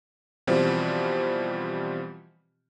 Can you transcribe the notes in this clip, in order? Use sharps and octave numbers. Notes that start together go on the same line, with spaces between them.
B2 E3 F3 G3 C4